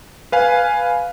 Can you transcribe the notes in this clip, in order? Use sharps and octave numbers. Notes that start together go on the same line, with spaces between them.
B4 F5 G#5